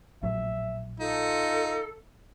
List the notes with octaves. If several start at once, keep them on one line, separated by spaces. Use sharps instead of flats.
A#1 A2 F#3 E5
D#4 F4 A4